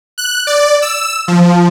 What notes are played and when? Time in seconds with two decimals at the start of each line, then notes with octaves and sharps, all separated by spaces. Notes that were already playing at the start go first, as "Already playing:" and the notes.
0.18 F#6
0.47 D5
0.82 E6
1.28 F3